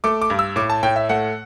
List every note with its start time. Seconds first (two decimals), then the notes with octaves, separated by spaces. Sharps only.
0.04 A3 D6
0.22 D6
0.30 G2
0.39 E6
0.56 A2 D6
0.70 A5
0.83 A2 G5
0.96 E5
1.09 A3 F#5